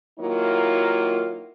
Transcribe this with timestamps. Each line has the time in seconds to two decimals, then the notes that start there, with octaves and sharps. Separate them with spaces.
0.19 D#3 F#3 A#3 E4 F4